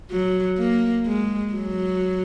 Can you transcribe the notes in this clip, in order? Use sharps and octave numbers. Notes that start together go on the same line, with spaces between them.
F#3
A#3
G#3
F#3